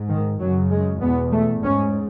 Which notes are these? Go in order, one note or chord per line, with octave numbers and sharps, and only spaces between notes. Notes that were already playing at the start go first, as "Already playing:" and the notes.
Already playing: G#2
D#3
F#2 C#3 F#3
G#3
E2 B2 B3
A3
G#2 C#4